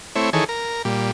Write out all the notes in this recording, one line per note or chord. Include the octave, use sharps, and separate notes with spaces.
A3 C4 E4 C#5
D#3 E3 G#4 A4 C#5
A#4
A#2 G3